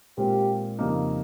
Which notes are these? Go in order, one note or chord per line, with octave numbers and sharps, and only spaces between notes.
A#2 G#3 C4 F4 G4
F2 C#3 G3 A#3 D#4